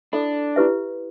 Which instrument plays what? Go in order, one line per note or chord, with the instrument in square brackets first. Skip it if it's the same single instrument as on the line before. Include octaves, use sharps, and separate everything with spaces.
[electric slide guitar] D4 [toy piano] E4 A4 E5 B5
[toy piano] E4 G4 B4 E5